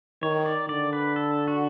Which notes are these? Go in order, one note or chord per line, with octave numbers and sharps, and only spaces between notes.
D#3 C#5
D5
D3 D5
B4
A4
F#4